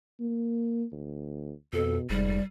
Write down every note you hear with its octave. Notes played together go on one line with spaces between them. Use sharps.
A#3
D2
F2 B2 A4
F1 G#2 G3